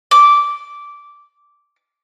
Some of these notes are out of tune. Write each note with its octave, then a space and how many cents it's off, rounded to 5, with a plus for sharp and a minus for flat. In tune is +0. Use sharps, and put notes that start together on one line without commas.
D6 -10